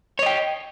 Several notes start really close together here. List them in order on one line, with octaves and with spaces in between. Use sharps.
C#5 D#5 G5